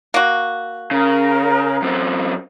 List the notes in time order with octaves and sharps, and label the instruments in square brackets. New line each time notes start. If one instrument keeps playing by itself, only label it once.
[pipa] A#3 F#4
[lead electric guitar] C#3 [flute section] A#4
[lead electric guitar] F#2 C4